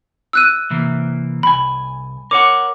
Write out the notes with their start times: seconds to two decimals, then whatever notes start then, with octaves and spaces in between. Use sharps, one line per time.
0.33 E6 F#6 D#7
0.70 C3 E3 A#3
1.43 C2 G#5 B5
2.31 A#4 C#5 F#5 D6